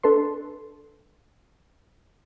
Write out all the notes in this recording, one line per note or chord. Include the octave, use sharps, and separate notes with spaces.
D4 A4 B4 C6